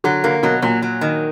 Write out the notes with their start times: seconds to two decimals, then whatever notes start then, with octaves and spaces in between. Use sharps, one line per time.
0.04 D3 F#3
0.24 D3 A#3
0.43 B2 F#3
0.62 A#2 F#3
0.82 F#3
1.01 D#3